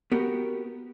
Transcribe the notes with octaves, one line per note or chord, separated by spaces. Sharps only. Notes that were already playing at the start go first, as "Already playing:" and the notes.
B3 F#4 G4 A#4